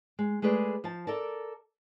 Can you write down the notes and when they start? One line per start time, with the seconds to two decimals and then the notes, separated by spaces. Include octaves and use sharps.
0.19 G#3
0.42 G#3 A3 G#4 B4 D5
0.84 F3 C5 A5
1.07 A4 A#4 D5 A5